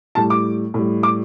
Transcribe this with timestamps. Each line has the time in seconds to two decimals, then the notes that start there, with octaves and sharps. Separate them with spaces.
0.15 A2 G3 A5
0.30 D6
0.74 A2 G3
1.03 D6